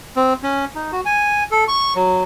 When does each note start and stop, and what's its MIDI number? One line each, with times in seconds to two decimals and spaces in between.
0.16 0.34 60
0.43 0.65 61
0.75 0.91 63
0.92 1.01 66
1.05 1.44 80
1.51 1.64 69
1.68 1.93 85
1.95 2.24 54